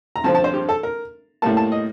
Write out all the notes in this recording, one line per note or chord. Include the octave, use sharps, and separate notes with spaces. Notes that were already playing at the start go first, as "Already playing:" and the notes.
A#5
G2 D3 F3 C4 A5
A5
C5
G4
A4
A#4
A2 G3 A#3 A5
A5
D#5